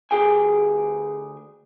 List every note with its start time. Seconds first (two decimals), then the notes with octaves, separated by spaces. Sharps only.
0.11 D2 G#2 G4 G#4 G5 G#5